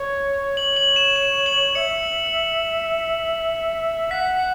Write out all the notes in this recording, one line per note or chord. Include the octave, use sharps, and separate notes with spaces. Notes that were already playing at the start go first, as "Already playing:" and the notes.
Already playing: C#5
C#5 F#7
F#7
E7
E7
F#7
E5 C#7
F#5 B6